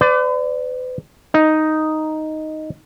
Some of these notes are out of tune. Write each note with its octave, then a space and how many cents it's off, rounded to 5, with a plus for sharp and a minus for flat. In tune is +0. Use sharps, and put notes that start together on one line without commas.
B4 +45 D5 +0
D#4 +0 D#5 +0